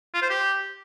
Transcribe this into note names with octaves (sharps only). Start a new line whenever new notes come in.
F4
C5
G4